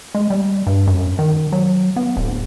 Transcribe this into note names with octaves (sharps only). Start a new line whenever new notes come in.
G#3
G3
G2
F#2
D#3
F#3
B3
D1